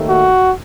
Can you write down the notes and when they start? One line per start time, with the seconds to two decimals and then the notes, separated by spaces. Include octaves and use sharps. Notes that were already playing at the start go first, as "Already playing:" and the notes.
Already playing: D#2 D#3 A3
0.09 F#4